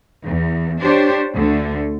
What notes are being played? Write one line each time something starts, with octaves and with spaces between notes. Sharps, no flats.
E2
D4 G4 C5 C#5
D2 D3 A3